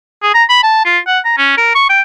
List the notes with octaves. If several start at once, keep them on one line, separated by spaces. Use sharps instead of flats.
G#4
A#5
B5
A5
F4
F#5
A#5
C#4
A#4
C#6
G5